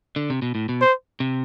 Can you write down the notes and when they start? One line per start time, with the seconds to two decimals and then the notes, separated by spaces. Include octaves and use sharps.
0.16 D3
0.30 C3
0.42 B2
0.55 A2
0.69 B2
0.81 C5
1.20 C3